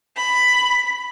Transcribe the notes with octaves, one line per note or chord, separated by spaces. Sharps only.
B5